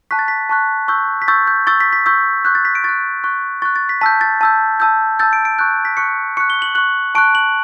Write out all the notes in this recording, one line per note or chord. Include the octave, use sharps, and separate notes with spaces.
A5 C#6 F#6 B6
A6
B6
A5 C#6 F#6
C#6 E6 G6
B6
C#6 E6 G6 A6
G6
C#6 E6 G6 A6
B6
B6
C#6 E6 G6
C#6 F#6 G6
A6
B6
D7
C#6 F#6 A6
C#6 F#6
C#6 F#6 A6
A6
B6
A5 E6 G6 B6
A6
A5 E6 G6
A5 E6 G6
A5 E6 G6 A6
D7
D7
C#6 F#6 G6
B6
C#6 F#6 C#7
C#6 F#6 C#7
G7
F#7
C#6 F#6 F#7
A5 C#6 F#6 D7
F#7